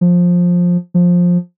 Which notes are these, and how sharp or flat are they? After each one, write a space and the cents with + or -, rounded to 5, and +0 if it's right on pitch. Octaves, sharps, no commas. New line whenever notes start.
F3 +15
F3 +15